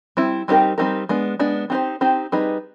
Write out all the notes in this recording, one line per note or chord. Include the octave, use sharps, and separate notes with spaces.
G3 C4 E4
G3 C4 D#4 G4 A#4
G3 C4 D#4 G4 A#4
G#3 B3 D4
G#3 B3 D4
C4 D#4 G4 C5
C4 D#4 G4 C5
G3 C4 D#4 G#4 B4